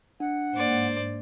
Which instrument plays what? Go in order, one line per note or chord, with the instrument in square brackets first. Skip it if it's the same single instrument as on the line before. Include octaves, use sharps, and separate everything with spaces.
[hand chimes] D4 [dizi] F#5
[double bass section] G#2 A#3 [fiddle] C5 D5